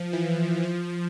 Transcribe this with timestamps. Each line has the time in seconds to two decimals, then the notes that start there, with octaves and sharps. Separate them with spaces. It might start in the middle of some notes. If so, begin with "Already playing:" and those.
Already playing: F3
0.13 E3
0.64 F3